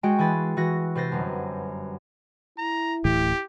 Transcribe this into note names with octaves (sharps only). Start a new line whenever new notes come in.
G#3 F#4 G5 D7
E3 G#4 B5 C6 A6
E3 F#4 A#6
C3 B4 C5 A6 A#6 C7
G1 F#2
E4 A#5
D1 A2 E3 G4